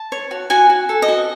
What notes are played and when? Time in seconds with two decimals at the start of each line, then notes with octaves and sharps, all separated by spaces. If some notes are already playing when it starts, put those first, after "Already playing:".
Already playing: A5
0.12 C#5
0.31 F#4
0.50 F#4 G#5
0.70 F#4
0.89 A4
1.02 D#5
1.08 F#4